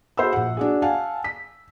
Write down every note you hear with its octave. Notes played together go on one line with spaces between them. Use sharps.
F#4 G#4 C5 B5 E6
A#1 F#5
D4 F#4 G#4
F5 F#5 G#5 A5
B6